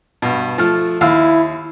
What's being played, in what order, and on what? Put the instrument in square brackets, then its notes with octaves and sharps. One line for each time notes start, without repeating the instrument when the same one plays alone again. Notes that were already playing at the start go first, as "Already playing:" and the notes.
[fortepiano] G2 B2
F3 A3 F6
[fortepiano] D#2 F5 E6 [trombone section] E4